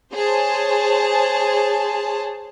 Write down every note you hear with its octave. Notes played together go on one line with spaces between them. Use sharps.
G#4 C5 C#5 A5